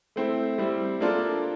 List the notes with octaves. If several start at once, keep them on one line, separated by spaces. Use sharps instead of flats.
A3 C4 E4
G3 C4 E4
A#3 D4 F4 A4